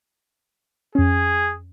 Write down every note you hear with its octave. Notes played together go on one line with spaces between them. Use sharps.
F2 C#4 G#4